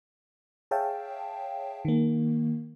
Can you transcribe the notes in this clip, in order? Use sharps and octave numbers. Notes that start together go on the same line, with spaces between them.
G#4 C#5 E5 F5 G5 A5
D#3 A#3